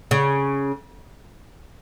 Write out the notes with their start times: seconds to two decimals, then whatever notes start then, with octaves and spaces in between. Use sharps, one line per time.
0.11 C#3